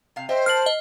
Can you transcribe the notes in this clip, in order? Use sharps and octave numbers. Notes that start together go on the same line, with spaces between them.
C3 F5
C5 D#5 E5 G5
A#4 A5 F6 C7 F#7
D#5